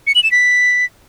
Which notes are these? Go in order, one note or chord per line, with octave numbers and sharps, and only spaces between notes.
C#7
F#7
E7
B6